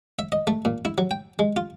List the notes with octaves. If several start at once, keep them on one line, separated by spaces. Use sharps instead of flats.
E5
D#5
A3
A#2
E4
F#3
G5
G#3
F4